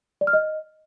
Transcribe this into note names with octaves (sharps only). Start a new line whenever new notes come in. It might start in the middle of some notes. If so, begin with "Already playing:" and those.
D5
F6
D#5